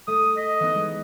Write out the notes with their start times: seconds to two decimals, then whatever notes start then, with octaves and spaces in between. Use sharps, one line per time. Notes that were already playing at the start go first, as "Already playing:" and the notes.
0.07 A3 D#6
0.37 D#5 B6
0.60 E3 B3 D#4
0.75 G#3